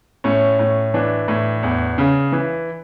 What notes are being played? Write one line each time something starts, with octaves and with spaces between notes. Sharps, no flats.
A2 C#4
A2
E3 D4
A2
E2
C#3
E3